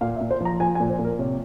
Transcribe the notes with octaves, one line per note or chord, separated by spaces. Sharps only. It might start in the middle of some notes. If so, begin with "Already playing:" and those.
A#2 F5
E5
A#2
C5
F3 A#5
F3 G#5
G#5
A#2
C5
A#2
A#4
C3 C#5